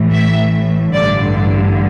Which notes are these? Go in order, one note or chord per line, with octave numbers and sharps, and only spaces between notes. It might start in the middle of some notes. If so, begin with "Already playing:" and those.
Already playing: A1 A2 E3
E5
A1 G2 D3 D5